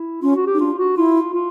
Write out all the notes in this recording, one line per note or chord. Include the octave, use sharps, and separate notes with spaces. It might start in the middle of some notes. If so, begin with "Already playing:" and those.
Already playing: E4
C#4 F4
F#4
G4
D#4
D4 F4
F#4
E4 F4
F4